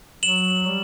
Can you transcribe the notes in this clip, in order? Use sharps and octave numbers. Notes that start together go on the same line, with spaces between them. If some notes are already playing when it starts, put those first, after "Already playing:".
F#3 E7 F#7
G3